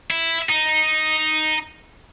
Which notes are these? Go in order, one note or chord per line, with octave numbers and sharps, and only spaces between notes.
E4
D#4